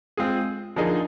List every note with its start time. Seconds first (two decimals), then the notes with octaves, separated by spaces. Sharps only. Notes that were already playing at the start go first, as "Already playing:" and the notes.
0.17 G#3 C4 F4 G#4
0.76 D3 F3 A#3 D#4 G#4